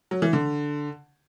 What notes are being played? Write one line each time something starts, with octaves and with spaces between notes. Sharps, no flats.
F#3
E3
D3